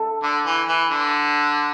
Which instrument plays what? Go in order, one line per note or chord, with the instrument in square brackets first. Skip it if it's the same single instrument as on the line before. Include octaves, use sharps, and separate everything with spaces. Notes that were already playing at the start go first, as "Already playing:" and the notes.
Already playing: [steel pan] A4
[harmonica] D3
E3
E3
D3